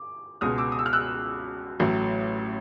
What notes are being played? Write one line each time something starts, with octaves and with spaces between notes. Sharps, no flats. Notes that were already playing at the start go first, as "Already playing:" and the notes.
Already playing: D6
C#2 B2 G#3 D#6 F6
D6 E6
D#6
E6
F6
E6 F#6
A1 A2 F#3